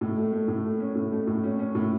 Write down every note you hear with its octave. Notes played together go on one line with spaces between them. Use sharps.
A2
A3
A3
A2
A3
C#4
A2
A3
A2
C#4
C#4
A2